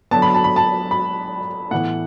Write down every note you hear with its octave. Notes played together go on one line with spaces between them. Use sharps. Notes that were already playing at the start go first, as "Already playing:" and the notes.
D3 F#3 B3 A5
B5
A5
B5
A5
B5
A2 E3 B3 F#5